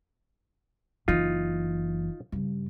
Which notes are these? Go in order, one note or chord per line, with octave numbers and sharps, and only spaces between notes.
F#1 E3 D#4 F4
G2 C#3